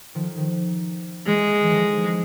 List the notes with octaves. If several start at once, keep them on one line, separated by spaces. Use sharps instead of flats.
D#3 F3
D#3
E3 G#3
E3
D#3 F3